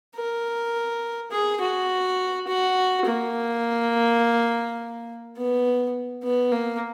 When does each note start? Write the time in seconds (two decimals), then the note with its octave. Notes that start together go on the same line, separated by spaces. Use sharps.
0.16 A#4
1.32 G#4
1.61 F#4
2.48 F#4
3.05 A#3
5.37 B3
6.24 B3
6.52 A#3